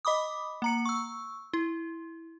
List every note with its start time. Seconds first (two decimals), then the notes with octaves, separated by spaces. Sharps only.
0.05 D#5 B5 D6 D#6
0.62 A#3 A#5 C#7
0.85 C#6 E6
1.53 E4